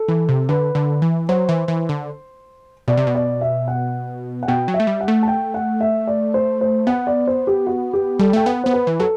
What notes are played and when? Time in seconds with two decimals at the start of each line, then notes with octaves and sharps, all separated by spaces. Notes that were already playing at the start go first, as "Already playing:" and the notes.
Already playing: A4
0.08 E3
0.29 C3
0.49 D3 B4
0.75 D3
1.02 E3
1.29 F#3 C5
1.49 E3
1.68 E3
1.89 D3
2.88 B2 D5
2.97 C3
3.07 B2
3.15 D5
3.41 E5
3.68 F#5
4.43 F#5
4.48 B2 G5
4.68 F#3
4.74 E5
4.80 A3
4.87 G3
5.01 F#5
5.08 A3
5.23 A5
5.28 G5
5.54 F#5
5.81 E5
6.07 D5
6.34 C5
6.61 C5
6.87 B3 F#5
7.07 D5
7.27 C5
7.47 G4
7.67 F#4
7.93 G4
8.19 G3 A4
8.33 A3 G5
8.46 B3 F#5
8.64 B3 C5
8.73 B4
8.87 E3
9.00 F#3 A4